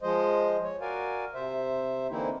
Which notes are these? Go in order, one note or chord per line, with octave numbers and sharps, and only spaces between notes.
F3 G#3 C5 D#5
C#5
F#4 A#4 D5 F5 G#5
C3 C5 E5
D3 E3 A#3 C4 D#4 E4